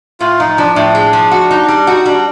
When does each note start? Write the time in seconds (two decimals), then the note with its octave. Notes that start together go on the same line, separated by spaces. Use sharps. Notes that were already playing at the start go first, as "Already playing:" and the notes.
0.20 A2 F4
0.39 F3 D#4
0.58 F3 D4
0.76 A2 D4
0.95 G#3
1.13 F3
1.31 F#4
1.51 D#4
1.68 G3
1.87 D#4 F#4
2.06 G3 D4